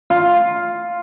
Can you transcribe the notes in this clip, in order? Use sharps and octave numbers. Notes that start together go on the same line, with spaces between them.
F4